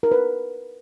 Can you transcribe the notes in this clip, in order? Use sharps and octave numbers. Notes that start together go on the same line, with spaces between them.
A#4
B4